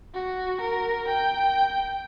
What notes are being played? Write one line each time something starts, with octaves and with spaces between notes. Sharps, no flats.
F#4
A#4
G5